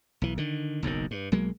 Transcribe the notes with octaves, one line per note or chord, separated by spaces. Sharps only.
B1 E3
D3 D#3
F#1 B1 F#2 D#3
G2
B1 F#3 G#3 A#3